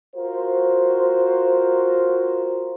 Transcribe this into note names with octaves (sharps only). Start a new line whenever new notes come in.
F4 F#4 A#4 C5